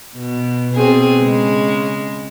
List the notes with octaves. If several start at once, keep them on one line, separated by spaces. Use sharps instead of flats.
B2
B2 C4 G#4
C#3 G#3